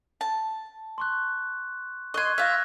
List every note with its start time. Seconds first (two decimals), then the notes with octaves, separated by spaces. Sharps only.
0.21 A5
0.98 C6 C#6 F#6
2.14 D#5 C6 C#6 F#6 G#6
2.38 F4 E5 F6 F#6 A#6